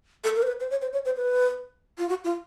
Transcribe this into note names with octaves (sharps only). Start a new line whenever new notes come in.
A4
A#4
C5
B4
C5
C#5
C5
C#5
C5
B4
F4
F#4
F4